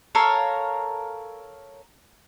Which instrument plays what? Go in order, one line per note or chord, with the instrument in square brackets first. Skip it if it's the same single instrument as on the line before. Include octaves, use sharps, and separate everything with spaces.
[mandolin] A4 A#4 C#5 F5